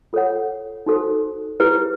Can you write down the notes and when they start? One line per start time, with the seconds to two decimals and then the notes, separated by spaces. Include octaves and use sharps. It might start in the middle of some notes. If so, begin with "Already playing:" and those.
0.13 F4 A4 C#5 F#5
0.86 D#4 F#4 A4 C5
1.60 E4 G4 B4